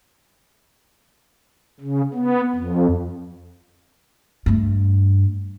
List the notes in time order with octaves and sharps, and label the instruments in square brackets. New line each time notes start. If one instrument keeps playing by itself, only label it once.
[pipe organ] C#3
B3
F2
[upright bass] G2 A3